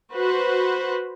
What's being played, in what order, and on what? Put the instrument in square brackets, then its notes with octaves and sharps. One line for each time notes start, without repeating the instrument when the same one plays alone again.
[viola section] F#4 B4 C5